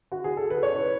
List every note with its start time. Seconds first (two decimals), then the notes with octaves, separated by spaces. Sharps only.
0.12 F#4
0.24 G#4
0.37 A4
0.50 B4
0.63 C#5
0.77 B4